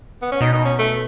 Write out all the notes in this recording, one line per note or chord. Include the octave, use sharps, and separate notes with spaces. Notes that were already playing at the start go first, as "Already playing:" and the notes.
B3
C#4
B2 D#4
D#4
C#4
A3